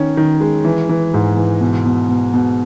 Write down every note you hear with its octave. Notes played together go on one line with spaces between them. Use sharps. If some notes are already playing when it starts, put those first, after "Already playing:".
Already playing: D#3 C#4
D#3
G#3
E3
E3
G#2
E3
B2
B2
B2
B2